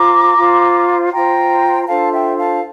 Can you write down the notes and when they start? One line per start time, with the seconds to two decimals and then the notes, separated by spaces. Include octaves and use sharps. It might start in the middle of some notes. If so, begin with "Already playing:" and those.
Already playing: F4 C5 A#5 D6
0.37 F4 C5
1.12 F4 C5 G5 A#5
1.82 A#5
1.88 D4 F4 A4 C5 F5 A5
2.13 E5 G5
2.38 F5 A5